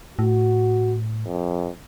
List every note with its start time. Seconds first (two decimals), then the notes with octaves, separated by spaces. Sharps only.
0.19 A2 F#4
1.26 F2